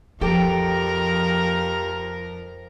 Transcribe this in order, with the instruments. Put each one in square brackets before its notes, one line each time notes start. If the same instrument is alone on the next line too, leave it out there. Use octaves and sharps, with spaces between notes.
[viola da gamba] F2 A#4 [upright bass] F3 [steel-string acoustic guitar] G4 A4 G5